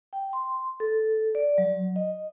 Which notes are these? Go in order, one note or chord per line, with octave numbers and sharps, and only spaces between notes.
G5
C6
A4
D5
F#3
D#5